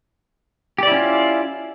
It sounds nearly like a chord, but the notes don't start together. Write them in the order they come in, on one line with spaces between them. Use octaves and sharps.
G4 D5 E4 C#4 F4